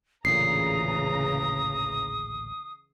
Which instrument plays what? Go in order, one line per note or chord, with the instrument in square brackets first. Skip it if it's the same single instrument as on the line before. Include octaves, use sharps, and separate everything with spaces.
[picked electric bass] A1 D2 A#2 [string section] C#3 E3 A#5 [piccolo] D#6 [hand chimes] C7